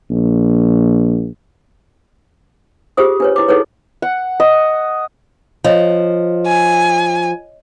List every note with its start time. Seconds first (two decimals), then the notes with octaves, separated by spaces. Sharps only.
0.11 A#1
2.97 F4 G4 G#4 C5 D#6
3.20 D4 B4 C#5
3.36 E4 D6
3.48 D#4 E4 G#4 A4 B4 C#5
4.02 F#5
4.40 D#5
5.64 F3 C#5 D#5
6.47 G#5